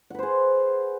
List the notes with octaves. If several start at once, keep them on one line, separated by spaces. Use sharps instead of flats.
G#4 B4 C5 F#5